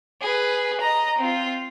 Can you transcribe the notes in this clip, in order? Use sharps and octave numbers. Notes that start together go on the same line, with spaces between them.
G#4 B4
D#5 A#5
C4 F4